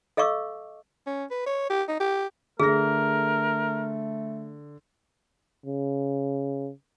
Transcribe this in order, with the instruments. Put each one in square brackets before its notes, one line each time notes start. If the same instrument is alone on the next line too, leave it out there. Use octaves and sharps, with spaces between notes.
[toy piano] A4 D#5 F5 C#6 D6 E6
[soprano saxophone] C#4
B4
C#5
G4
D#4
G4
[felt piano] D3 A#6 [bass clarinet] A3 [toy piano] G#4 [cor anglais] A#4
[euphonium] C#3